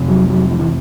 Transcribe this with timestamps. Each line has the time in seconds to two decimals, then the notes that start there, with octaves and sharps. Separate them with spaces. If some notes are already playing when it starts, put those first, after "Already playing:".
Already playing: F2 C3
0.08 F#3
0.29 F#3
0.51 F3
0.59 E3